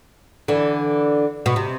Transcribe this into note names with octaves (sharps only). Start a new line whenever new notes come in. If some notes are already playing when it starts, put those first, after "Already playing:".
D3 E3
B2
C3